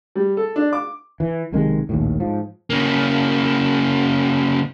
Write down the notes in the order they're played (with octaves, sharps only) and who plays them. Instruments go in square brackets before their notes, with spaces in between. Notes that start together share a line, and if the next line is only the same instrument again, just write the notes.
[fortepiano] G3
A4
D4
D6
[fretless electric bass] E3
B1 C3 D#3 G#3
A#1 D#2 A2
G#2 F3
[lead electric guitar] C#3 A#3